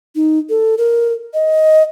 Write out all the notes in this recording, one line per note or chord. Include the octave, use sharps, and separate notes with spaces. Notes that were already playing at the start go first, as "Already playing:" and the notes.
D#4
A4
A#4
D#5